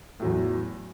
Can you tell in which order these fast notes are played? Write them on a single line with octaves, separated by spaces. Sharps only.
A2 F#3 E2